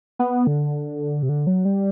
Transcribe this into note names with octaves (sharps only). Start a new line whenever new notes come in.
B3
D3
C3
D3
F#3
G3